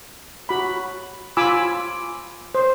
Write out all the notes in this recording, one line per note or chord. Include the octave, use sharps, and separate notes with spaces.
F#4 B5
F4 G#5 B5 D6 E6
C5